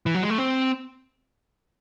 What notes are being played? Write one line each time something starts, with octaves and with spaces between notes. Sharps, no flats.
E3
F#3
G#3
A3
C4